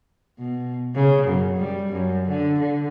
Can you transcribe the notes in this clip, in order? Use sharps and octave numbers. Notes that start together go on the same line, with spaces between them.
B2
C#3
F#2
G3
F#2
D3
D3